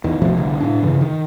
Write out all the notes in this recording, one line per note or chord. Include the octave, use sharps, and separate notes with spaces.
E2 D#3
G#1 B2 F3 A3
C2 D3
A2 D4
G2 C#3 E3
D#3